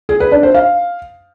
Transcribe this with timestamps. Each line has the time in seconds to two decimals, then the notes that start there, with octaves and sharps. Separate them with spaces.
0.09 G#4
0.20 B4
0.32 D4
0.43 C5
0.54 F5